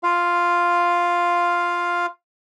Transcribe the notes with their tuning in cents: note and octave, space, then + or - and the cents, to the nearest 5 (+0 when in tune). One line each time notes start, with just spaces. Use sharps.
F4 +0 F5 +0